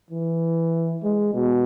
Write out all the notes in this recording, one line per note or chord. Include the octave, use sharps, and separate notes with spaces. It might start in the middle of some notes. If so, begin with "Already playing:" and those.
E3
G#3
B2